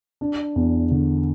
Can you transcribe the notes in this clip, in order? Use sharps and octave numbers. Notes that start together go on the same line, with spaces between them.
D4
E2
D3